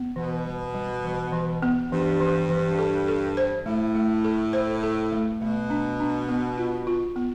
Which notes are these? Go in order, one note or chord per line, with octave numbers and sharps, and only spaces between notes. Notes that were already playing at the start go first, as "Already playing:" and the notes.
Already playing: B3
B2 E3
G3
G3
E3
E3
B3
G2 E3
E3
E3
A4
A4
C5
A2 A3
A3
A4
C5
A4
A3
B2 A3
D4
D4
B3
F4
F4
B3